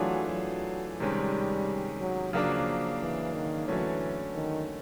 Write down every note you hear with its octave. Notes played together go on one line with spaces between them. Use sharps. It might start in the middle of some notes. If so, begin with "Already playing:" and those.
Already playing: E3 F#3 A3 D4 F4 G#4
F#3
C3 D#3 G3 G#3 C#4
F#3
C#3 F3 F#3 A#3 D4
E3
D#3
D3 E3 F#3 A3 C#4
D#3